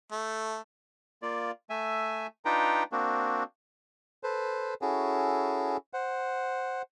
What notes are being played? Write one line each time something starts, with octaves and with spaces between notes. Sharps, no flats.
A3
A#3 F4 D5
A3 E5 G#5
D4 D#4 F4 B4 G5 A#5
A#3 C4 D4 F#4
A4 B4 C5
C#4 E4 F#4 G#4 A4
C5 F#5